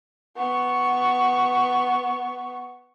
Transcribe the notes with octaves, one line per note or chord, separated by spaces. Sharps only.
B3 C#6